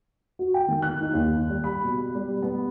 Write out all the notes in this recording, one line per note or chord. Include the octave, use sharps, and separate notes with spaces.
F#4
G5
D#3
F#6
D#4
D#2
G3
B5
B2
G3
B3